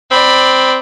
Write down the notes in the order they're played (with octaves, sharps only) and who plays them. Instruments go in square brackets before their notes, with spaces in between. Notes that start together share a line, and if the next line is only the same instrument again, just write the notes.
[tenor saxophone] C4 [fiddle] D5 B5